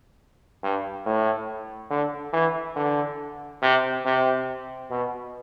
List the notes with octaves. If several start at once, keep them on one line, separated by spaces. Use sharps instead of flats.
G2
A2
D3
E3
D3
C3
C3
B2